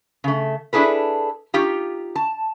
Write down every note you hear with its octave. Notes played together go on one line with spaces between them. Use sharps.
C#3 A3
D4 E4 G#4 A4 B4
D#4 F4 G4
A5